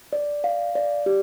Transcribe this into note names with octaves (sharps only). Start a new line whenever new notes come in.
D5
F5
D5
G4